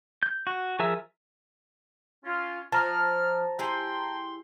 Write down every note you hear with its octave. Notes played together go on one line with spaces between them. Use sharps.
G6
F#4
F3 G#4 A#4 E5 E6
C#4 F4
F3 A5 A#5 F6
E4 G4 G#4 G5 C6